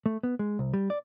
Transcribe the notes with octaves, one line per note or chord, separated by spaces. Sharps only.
A3
B3
G#3
C2
G3
D5